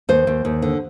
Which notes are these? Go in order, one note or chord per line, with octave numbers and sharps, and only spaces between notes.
D#2 C5
D#2
D#2
D3